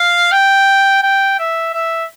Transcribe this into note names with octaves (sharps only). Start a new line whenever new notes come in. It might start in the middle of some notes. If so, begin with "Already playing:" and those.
Already playing: F5
G5
G5
E5
E5